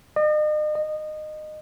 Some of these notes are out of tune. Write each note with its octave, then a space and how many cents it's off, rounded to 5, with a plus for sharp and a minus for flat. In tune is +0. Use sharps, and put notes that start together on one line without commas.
D#5 -40
D#5 -20